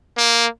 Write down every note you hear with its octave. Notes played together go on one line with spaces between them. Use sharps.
A#3